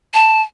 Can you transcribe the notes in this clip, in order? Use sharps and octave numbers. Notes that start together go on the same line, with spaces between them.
A5